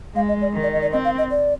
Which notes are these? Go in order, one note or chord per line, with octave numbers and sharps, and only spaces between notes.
G#3 F5
D#5
D5
D#3
D5
D#5
D5
C4 D#5
F5
D#5
D5